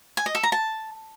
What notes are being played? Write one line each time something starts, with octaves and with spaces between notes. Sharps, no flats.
G#5
D#5
A4
A#5
A5